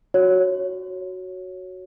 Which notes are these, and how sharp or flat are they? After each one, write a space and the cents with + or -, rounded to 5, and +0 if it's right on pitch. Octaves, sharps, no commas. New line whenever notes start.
F#4 +0 C#5 +0